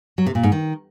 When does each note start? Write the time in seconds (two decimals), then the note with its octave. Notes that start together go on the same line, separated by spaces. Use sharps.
0.18 F#3
0.26 C3
0.35 A#2
0.43 G#2
0.52 D#3